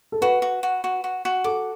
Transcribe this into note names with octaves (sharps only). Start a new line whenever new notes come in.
A4
F#4 B4
F#4
F#4
F#4
F#4
F#4
A4 D6